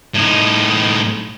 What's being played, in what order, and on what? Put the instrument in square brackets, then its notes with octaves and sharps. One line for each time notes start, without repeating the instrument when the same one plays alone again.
[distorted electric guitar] A2 D#4